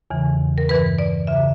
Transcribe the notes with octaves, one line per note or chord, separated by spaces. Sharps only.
E2 C#3 E3
A#4
G2 E3 B4
D5
E2 C#3 E3 E5